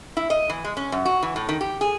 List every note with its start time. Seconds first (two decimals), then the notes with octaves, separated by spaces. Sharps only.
0.17 E4
0.30 D#5
0.50 E3
0.65 G#3
0.77 C#4
0.92 F#2
1.05 F#4
1.22 E3
1.36 A2
1.49 D#3
1.61 G4
1.81 G#4